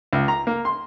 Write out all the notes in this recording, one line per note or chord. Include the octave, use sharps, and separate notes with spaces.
C#2
A#5
A#3
C6